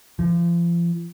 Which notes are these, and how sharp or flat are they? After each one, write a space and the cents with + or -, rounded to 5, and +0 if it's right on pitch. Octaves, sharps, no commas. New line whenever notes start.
F3 -35